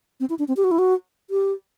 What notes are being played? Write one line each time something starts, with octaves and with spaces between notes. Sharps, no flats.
C4
E4
D4
C4
G4
F#4
E4
F#4
G4